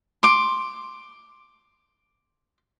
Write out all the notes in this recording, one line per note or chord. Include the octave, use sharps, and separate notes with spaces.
C6 D6